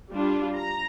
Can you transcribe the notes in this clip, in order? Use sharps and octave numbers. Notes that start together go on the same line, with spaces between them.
G3 D4 F4
A#5